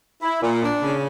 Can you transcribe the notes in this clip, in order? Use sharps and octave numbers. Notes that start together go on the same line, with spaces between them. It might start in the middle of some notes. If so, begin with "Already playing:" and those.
E4
A#2
D4
C#3